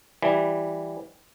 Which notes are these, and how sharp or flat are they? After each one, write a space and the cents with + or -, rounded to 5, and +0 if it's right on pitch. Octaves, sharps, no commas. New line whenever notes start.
E3 +0 G3 +0